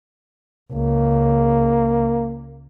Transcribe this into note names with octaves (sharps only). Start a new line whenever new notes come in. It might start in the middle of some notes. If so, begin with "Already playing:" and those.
C#2 A#3